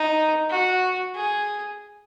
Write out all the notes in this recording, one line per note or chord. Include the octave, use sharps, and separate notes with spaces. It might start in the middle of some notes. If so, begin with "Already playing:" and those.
Already playing: D#4
F#4
G#4